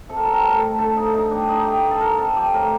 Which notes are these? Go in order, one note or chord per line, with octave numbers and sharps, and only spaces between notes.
C3 A4
A#4
G3 A4
A#4
A2 A4
A#4
A3 A4
D3 A4
F3 D#4
A2 D#4
G3 D4
D3 D#4
A3 G4
G2
A4
D3 A#4
C3 A4
F3 G4
A2 A#4